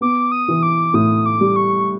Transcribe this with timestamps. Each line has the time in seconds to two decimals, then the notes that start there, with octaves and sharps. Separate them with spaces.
0.01 B3 D6
0.32 D#6
0.48 E3
0.63 D6
0.94 A2 D#6
1.26 D6
1.41 G3
1.56 C#6